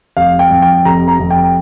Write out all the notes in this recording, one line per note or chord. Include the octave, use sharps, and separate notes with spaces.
F1 F5
G5
F2
G5
F1 A#5
A#5
F1
G5